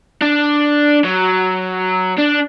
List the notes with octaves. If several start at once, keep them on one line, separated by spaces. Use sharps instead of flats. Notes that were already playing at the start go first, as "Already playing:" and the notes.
D4
F#3
D4